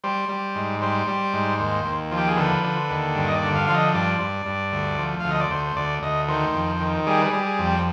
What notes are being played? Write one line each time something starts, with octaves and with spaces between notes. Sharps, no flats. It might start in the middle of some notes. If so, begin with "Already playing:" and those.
G3 C5
G3
G#2
G3 C5
G3
G#2
D#2
D#2
F3
G4
G#4
D3 B4
D3
D#2
G2
D#5
D5
D3
F5
F3 F5
D#5
G2 D5
G2
G2
D2
F3
D2 F5
D#5
D5
D2 C5
C5
D2 D5
D2 D#5
D#3 C5
F2
D#3
G3 G#4
B4
G#4
G3
G#4
F2
C4